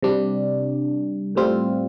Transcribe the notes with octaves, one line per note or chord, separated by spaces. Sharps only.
C3 G3 D4
A2 G3 C4 F4